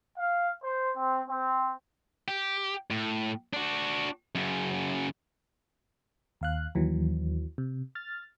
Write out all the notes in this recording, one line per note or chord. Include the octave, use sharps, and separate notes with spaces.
F5
C5
C4
C4
G4
A2
D4 F#4
F#2 C#3
D#2 F5 F#6
D#2 E3 F#3
C3
F6 A6